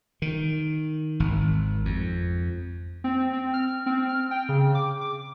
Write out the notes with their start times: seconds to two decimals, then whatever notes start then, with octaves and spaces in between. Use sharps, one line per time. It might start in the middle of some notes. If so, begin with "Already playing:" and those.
0.22 D#3
1.20 G#1
1.85 F2
3.04 C4
3.33 C4
3.54 F6
3.86 C4
4.09 F6
4.31 G5
4.49 C#3
4.75 D6
5.01 D6